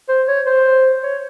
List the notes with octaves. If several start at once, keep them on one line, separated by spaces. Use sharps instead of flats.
C5
C#5
C5
C#5